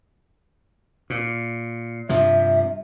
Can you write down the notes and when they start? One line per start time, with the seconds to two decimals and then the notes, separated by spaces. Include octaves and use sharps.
1.10 A#2
2.09 G2 C3 F3 E5